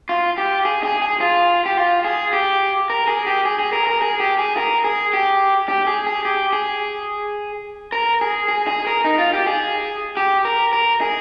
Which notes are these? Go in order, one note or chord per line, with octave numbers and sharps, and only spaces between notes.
F4
G4
G#4
G#4
G#4
F4
G4
F4
G#4
G4
A#4
G#4
G4
G#4
G#4
A#4
A#4
G#4
G4
G#4
A#4
G#4
G4
G4
G#4
G#4
G4
G#4
A#4
G#4
G#4
G#4
A#4
D#4
F4
G4
G#4
G4
A#4
A#4
G#4